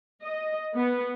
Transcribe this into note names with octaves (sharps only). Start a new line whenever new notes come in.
D#5
B3